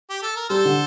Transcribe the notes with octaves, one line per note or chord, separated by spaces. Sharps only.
G4
A4
A#4
G3 A4 C5
D3